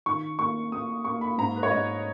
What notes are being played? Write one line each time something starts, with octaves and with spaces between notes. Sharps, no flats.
D#3 C#6
A#3 C#6
A#3 D#6
A#3 C#6
B5
G#2 A#5
B4
C#5
G#2 D#5